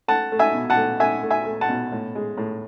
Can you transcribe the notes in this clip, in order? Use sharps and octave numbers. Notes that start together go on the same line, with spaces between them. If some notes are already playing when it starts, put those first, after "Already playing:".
A3 F#5 A5
A3
E5 G#5
B2
F#5 A5
A3
A3 E5 G#5
A3
E5 G#5
A3
F#5 A5
B2
A2
G#3
A2